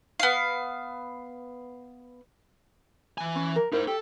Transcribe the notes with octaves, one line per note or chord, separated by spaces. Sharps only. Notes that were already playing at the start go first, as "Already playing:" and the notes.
B3 F5
E3 G#5
C#4
A#4
D#4 E4 A#4 C5 E5
G4 A4